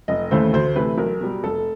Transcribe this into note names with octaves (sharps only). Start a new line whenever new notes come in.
F1 D#5
D#2 C#3 E3 A3 C5
D2 C5
C3 E3 A3 B4
B1 A#4
B2 G3
F1 A4